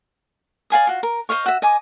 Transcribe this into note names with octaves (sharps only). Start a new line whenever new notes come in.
D5 F5 G#5 D#6
F4 F#4
A#4
C5 D#5 F5 C#6
F#4 E5
D#5 G#5 D6